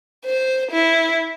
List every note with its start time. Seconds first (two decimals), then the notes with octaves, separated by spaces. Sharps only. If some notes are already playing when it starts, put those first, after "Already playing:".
0.25 C5
0.71 E4